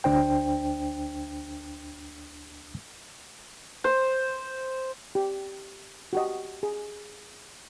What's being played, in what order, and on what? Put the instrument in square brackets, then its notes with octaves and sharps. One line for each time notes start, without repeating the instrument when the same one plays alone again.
[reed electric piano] D2 D4 C5 G5
[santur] C5
[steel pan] G4
F#4 G4 D#5
G#4